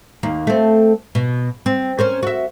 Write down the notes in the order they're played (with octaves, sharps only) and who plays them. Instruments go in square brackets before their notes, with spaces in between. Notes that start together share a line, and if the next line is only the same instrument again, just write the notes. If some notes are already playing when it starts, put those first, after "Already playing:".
[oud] D#2 A#3
A3 C4
B2
C4
C#4 A#4 C5
F#4 E5